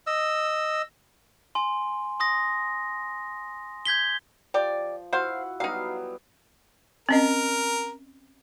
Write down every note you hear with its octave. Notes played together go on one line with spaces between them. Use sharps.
D#5 E6
G#5 C6
C6 D#6 A#6
G6 G#6 B6 G7
F3 G4 D5
E4 F#4 C5 F5 F#5
F#3 G3 B3 D#4 F5
C4 C#4 A#4 D#5